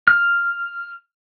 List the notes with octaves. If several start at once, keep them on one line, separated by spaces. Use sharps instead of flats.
F6